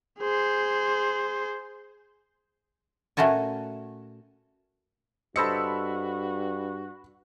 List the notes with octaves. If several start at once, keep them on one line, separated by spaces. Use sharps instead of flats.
G#4 C5
A#2 A3 C#4 F#4 A4 G#5
G2 F#4 A4 C5 D#5 B5 E6 C#7